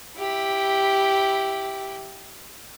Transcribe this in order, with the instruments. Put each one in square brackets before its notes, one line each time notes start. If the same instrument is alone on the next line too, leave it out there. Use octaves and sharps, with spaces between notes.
[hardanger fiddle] E4 G4